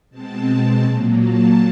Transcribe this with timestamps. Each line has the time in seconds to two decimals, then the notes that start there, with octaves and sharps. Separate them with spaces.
0.10 B2 G#3 C4 A5
0.83 A#2 F#3 A#3
1.20 A5